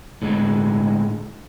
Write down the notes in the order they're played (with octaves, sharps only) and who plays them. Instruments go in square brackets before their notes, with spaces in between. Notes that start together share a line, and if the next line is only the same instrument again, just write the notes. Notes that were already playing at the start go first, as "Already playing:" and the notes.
[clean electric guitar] A2 D3 G#3